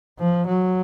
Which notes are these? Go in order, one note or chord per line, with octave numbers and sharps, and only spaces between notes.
F3
F#3